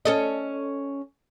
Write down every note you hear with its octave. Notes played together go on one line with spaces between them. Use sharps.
C#4 A4 D#5